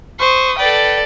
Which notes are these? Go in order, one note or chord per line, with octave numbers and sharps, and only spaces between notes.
C5 C#6 D#6
A4 B4 D5 G5